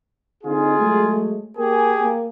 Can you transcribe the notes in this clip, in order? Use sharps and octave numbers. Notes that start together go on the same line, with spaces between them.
D3 C4 D#4 F4 G#4
F#3 G#3 A3
A#3 G4 G#4 A#4 G#5
A#3